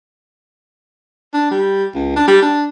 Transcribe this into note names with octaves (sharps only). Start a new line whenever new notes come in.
D4
G3
C#2
D4
G3
D4